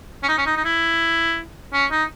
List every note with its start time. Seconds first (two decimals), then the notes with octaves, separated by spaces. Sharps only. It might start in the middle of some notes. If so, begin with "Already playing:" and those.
0.23 C#4
0.29 D#4
0.38 C#4
0.46 D#4
0.57 D#4
0.65 E4
1.73 C#4
1.91 D#4